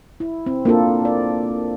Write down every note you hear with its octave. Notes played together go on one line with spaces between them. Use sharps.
E4
C4
A#3 D4 F4 A4
D5